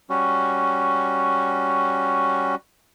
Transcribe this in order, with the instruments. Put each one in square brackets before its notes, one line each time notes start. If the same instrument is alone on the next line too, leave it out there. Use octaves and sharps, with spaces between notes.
[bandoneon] G3 C#4 F#4